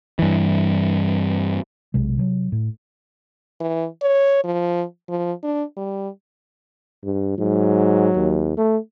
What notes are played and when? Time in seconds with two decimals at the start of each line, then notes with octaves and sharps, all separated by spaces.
0.19 G2 E3
1.94 B1 C3 G#3
2.18 C3 F3 F#3
2.52 A2
3.60 E3
4.02 C#5
4.44 F3
5.09 F3
5.43 D4
5.76 G3
7.04 G2
7.38 G#2 F#3
8.15 D#2
8.58 A3